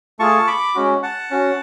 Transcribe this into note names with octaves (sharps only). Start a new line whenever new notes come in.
A3 F4 G#4 A5 C#6
B5 D6
G#3 C#4 F#4
F#5 A5
C#4 F#4